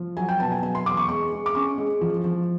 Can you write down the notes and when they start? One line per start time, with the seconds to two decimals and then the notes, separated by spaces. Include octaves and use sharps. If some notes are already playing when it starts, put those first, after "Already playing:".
Already playing: F3
0.17 F#3 G#5
0.29 G5
0.40 B2 A5
0.52 G#5
0.63 F#3 G#5
0.75 C6
0.86 E2 D6
0.97 C#6
1.09 G#3 C#6
1.32 G#3
1.46 D6
1.55 C#4 C#6
1.78 G#3
2.01 F3
2.24 F3